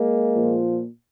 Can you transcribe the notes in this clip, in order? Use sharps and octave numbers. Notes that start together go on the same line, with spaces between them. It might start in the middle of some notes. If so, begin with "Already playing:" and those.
Already playing: G#3 A#3
A#2 F3